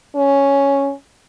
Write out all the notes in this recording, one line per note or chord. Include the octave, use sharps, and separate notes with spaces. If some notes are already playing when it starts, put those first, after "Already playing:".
C#4